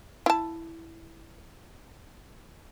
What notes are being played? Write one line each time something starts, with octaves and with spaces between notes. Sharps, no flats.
E4 A5